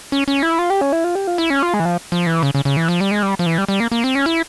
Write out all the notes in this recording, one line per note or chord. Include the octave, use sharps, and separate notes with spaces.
C#4
C#4
E4
F4
G4
C#4
E4
F4
G4
F4
E4
C#4
F4
G#3
E3
F3
F3
E3
C#3
C#3
C#3
E3
F3
G3
G#3
G3
F3
E3
G3
G3
A#3
A#3
C4
C#4
E4